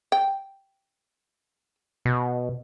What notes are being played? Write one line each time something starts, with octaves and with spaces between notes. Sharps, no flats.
G5
B2